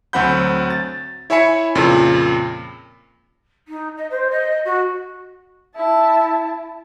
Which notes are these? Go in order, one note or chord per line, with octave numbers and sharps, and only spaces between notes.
D2 F#3 C4 F#5 B5 G6
A6
E4 C#5 E5 G#5 B5 C#7
F2 A#2 C#3
D#4
D#5
C5
D#5
F#4
E4 A5